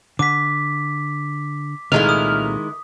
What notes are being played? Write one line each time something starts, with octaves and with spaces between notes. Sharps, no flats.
D3 D6 B6
C2 A#2 D#3 G#3 A3 E4 F6
D#6